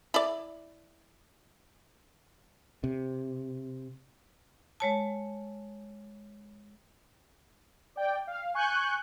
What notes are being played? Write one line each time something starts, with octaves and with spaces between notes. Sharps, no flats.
E4 D5
C3
G#3 C#5 A5
D5 G5
F5
G#5 C#6 F#6 G6